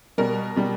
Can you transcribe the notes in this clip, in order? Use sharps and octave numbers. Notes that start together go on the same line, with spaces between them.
B2 G3 A#4
B2 G3